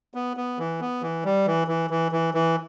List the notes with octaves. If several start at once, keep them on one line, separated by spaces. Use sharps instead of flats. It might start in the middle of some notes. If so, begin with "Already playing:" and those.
B3
B3
E3
B3
E3
G3
E3
E3
E3
E3
E3